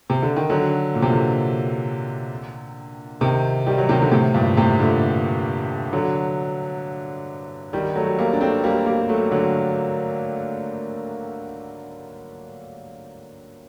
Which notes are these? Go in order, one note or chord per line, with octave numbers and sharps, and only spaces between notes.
C3
D3
D#3
D3 F#3
A#2
C3
A#2 D3
C3 D#3
D#3 G3
F#3
C3 D#3
D3
A2 C3
G2 A#2
A2 C3
A#2 D3
D3 F#3
D#3 G3
F#3 A3
G3 A#3
D4
A3 C4
G3 A#3
G3 A#3
F#3 A3
D3 F#3